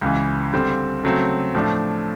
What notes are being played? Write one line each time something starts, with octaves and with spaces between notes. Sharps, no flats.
C#2 C#3 E3
D3 G3 C4
C#3 F#3 A3 C4
A2 F3 A3 D4